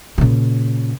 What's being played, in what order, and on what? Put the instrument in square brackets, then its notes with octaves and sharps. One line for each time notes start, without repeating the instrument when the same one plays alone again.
[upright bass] A#2 C#3